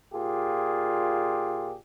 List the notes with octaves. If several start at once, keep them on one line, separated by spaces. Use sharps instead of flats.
A#2 F4 G4 G#4